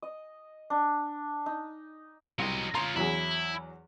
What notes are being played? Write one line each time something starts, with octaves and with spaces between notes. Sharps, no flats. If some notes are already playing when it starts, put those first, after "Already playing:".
D#5
D4
D#4
C2 F#3 D#5
F4 C#5 A#5 C6
E2 F#3 E4 G#4